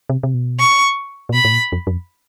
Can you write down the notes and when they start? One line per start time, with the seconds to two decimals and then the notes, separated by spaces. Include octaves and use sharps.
0.09 C3
0.23 C3
0.34 B2
0.59 C#6
1.29 A#2
1.34 B2 B5
1.45 A2
1.52 A#2
1.72 F2
1.87 F#2
1.91 F2